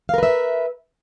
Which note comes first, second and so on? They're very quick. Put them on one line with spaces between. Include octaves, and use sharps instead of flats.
F5 A#4 B4 E5